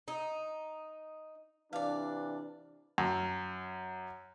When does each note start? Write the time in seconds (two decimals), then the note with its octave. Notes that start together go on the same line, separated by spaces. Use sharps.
0.08 D#4
1.73 C3 E3 D4 D5 F5
2.98 F#2